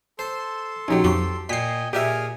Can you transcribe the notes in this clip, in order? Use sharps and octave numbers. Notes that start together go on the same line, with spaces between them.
A4 C5 C6
A#1 F#3 C#4 D#4 G4
F2 F#3 G4
A#2 D#5 G5 G#5 B6 C7
A#2 G4 G#4 A#4 D#5 E5 G#5 F6